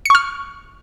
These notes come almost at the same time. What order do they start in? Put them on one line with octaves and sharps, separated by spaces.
C#7 C#6 F6